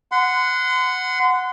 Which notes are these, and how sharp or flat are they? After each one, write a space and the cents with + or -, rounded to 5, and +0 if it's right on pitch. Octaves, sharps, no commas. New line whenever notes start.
F#5 -5 C6 -35